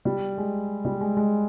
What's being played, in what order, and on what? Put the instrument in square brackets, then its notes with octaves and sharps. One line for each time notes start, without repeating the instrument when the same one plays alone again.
[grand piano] G3
G#3
G3
G#3
G#3